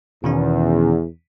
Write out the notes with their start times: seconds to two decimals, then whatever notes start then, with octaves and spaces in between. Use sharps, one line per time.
0.24 E2 B2 D#3 C#4